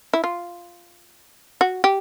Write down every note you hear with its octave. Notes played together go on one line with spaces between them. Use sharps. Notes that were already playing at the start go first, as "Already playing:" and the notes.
E4
F4
F#4
G4